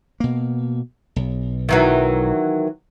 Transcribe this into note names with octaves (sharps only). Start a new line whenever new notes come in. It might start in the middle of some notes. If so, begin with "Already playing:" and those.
B2 A#3
B1
D#3 E3 F#3